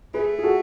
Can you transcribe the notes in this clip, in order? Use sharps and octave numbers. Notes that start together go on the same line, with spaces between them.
A3 G#4 B4
G#4
F#4 A4